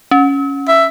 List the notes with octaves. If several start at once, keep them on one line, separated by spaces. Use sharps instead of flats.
C#4
E5